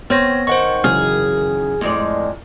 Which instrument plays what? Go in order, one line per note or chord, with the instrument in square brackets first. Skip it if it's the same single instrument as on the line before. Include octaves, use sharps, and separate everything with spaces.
[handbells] B3 C#5 A#6 [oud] C4
[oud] D#3 [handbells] C5 F#5 C#6
[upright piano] F#2 C#3 E3 [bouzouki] G#4 [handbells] F6
[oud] F2 G#3 D5 [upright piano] A2